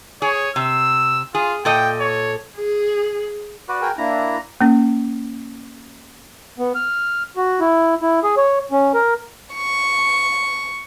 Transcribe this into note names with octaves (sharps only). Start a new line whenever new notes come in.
G#4 C#5
C3 E6
F4 G#4
A#2 A4 D#5 G5
C#5
G#4
F#4 B4 D5
G#4 A#4 G5
A#3 D4 E4 A#5
A#3 C#4
B3
F6
F#4
E4
E4
G#4
C#5
C#4
A#4
C#6